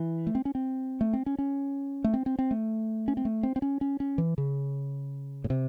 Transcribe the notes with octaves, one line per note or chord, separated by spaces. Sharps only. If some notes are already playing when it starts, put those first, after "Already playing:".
Already playing: E3
A3
C4
C#4
C4
A3
C4
C#4
C#4
A3
C4
C4
C4
A3
C#4
C4
A3
C4
C4
C#4
C#4
C#4
E3
C#3
A2
C3